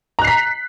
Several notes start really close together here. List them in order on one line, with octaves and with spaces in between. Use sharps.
A#5 F#6 C7 B6